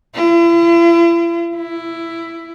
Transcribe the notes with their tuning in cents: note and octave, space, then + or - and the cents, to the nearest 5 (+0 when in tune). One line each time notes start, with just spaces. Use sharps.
E4 +45
E4 +10